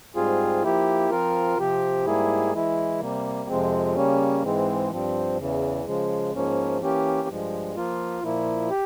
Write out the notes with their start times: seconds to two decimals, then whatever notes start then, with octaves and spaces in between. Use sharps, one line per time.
0.15 G#2 G3 C4 F4 G#4
0.63 F3 A#3 E4 G4
1.10 F3 C4 F4 A#4
1.58 C3 F3 C4 G4
2.05 G#2 G3 A#3 E4 G#4
2.54 E3 G#3 E4
3.01 C3 G3 A#3
3.48 F2 C3 F3 G#3 C4
3.95 C#3 G3 A#3 C#4
4.43 G#2 E3 G#3 C4
4.91 G2 F3 C4
5.38 E2 C#3 E3
5.85 C#3 F3 G#3
6.33 G#2 F3 A#3 C#4
6.80 E3 A#3 C#4 G4
7.28 G2 F3 G#3
7.76 F3 A#3 F4
8.23 A#2 F3 A#3 E4
8.70 G4